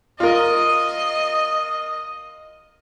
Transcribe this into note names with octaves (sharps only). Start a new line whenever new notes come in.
F4 A#4 D#5